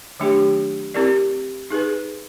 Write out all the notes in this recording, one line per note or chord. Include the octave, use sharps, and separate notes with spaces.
D#3 F#3 A3 D4 G4
C4 E4 G4 A#4 D5
D#4 G#4 B4